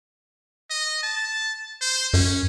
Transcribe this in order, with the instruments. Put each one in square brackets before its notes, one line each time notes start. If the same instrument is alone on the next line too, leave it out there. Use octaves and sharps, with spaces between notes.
[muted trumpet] D#5
A5
C5
[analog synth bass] F#2 [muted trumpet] C#4